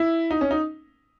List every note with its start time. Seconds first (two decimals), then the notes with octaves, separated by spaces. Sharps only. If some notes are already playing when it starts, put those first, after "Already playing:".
Already playing: E4
0.31 D#4
0.41 C#4
0.51 D#4